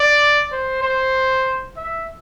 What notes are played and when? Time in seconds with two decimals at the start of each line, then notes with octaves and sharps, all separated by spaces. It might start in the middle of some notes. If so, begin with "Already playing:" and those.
Already playing: D5
0.52 C5
0.83 C5
1.77 E5